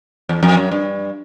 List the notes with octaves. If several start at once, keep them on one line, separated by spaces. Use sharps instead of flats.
E2
F2
F#2
G2